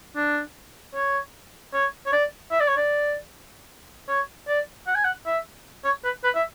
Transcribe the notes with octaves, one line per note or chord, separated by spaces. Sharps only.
D4
C#5
C#5
C#5
D5
E5
D5
C#5
D5
C#5
D5
F#5
G#5
F#5
E5
C#5
B4
B4
E5